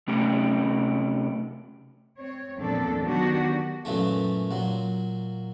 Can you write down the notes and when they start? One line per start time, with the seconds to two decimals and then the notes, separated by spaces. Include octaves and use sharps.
0.07 C3 A3 C#4 G4
2.18 C4 C#5
2.58 E2 A#2 F3 C4 D4 A4
3.05 D#3 F#3 B3 D4 F#4 G4
3.85 F#2 A#2 E3 A3
4.51 A#2 F#3